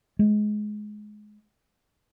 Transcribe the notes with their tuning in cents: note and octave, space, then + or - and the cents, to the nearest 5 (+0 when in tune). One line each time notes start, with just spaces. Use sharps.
G#3 +20